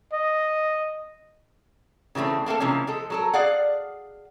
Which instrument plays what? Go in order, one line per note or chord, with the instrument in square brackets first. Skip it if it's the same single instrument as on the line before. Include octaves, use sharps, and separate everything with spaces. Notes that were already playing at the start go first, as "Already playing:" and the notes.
[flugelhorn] D#5
[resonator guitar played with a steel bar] C#3 E3 G3 A3 C4
A3 A#3 C4 A4
C3 E3 F3 G#3 A#3 C#4
F3 G#3 A4
F#3 A4 A#4
G#4 D5 F5 F#5